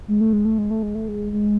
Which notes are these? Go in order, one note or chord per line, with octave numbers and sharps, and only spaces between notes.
G#3
A3
G#3
A3
G#3
A3
G#3
A3
G#3
G#3